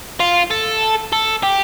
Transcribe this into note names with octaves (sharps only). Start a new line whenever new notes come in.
F4
A4
A4
G4